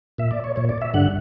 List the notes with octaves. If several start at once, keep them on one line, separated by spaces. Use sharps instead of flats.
A#2 E5
D5
C#5
A#2 C#5
D5
E5
G2 D3 F#5